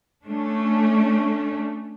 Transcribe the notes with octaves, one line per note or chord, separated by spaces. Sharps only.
A3 C#4 D4